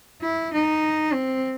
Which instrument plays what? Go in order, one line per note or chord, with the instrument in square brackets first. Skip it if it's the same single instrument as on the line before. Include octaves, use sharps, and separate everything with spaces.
[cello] E4
D#4
C4